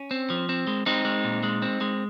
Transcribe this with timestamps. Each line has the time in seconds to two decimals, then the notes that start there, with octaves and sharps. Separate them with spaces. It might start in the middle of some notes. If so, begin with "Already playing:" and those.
Already playing: C#4
0.11 C4
0.30 F3
0.49 C4
0.67 G#3
0.86 G#3 C4 D#4
1.05 G#3
1.24 A#2
1.43 G#3
1.62 C4
1.81 G#3